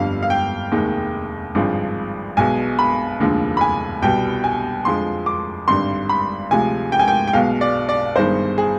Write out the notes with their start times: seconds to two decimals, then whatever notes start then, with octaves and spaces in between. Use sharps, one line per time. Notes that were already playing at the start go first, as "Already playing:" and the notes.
Already playing: G1 F2 D3 G3 F5
0.23 F5
0.30 G5
0.71 F1 D#2 D#3 G#3
1.55 G#1 G2 D3 F3 G#3
2.37 B1 B2 G#3 G#5
2.79 B5
3.20 F1 D#2 D3 F3 G#3
3.57 B5
3.61 G#5
4.02 C2 B2 G3 G5
4.44 G#5
4.85 F2 D3 F3 G#3 C6
5.26 D6
5.68 G#1 G2 D3 G3 C6
6.09 B5
6.51 D2 C3 F3 G#3 G#5
6.92 G5
6.99 G#5
7.08 G5
7.28 G5
7.33 B1 B2 G#3 F5
7.61 D5
7.89 D5
8.16 G1 G2 D#3 G#3 C5
8.58 G#4